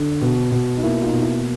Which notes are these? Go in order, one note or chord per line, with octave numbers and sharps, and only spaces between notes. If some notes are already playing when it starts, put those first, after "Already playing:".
Already playing: D3
B2
B2
D#4
A#3 E4
D#4 F4
B2
E4